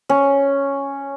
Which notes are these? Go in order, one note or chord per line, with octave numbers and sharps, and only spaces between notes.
C#4